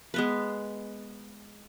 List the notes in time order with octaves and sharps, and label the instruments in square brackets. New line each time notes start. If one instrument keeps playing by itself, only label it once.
[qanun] G#3 B3 B4